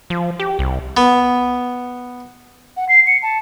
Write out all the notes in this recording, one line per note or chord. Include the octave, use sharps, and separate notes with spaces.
F3
G4
C2
B3
F#5
C7
C#7
A5